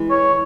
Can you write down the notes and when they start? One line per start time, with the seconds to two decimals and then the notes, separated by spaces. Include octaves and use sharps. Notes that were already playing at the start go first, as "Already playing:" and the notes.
Already playing: E3 G#3
0.10 C#5